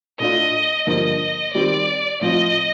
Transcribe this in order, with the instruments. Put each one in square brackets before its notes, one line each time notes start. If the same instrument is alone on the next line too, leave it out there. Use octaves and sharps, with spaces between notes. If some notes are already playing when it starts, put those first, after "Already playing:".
[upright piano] A2 A3 D4 F4 [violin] D#5
[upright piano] G2 D3 F3 A#3 [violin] D#5
[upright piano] D#3 G3 C4 [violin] D5
[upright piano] A2 F3 C4 F4 [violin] D#5